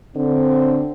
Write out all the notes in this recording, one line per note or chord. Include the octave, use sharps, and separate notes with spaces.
D3 C4